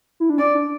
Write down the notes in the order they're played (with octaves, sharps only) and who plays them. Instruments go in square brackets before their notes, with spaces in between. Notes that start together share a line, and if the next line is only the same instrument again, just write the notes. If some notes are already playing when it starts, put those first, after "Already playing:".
[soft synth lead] E4
D4
[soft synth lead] C#4 [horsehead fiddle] D5
[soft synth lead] D4